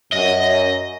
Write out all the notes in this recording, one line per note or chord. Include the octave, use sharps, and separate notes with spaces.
F#2 D#5